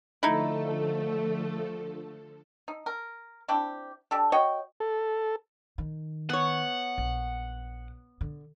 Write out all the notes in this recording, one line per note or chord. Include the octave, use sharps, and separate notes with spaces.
D3 F3 A3 D#4 E4 A4
D#4
A#4
C4 D4 E4 G4
D4 G4 A4
F#4 C#5 D#5 G5
A4
D#3
B3 C#5 F#5
A#1
D3